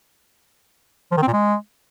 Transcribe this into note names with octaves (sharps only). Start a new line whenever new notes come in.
F3
D#3
C4
A#2
G#3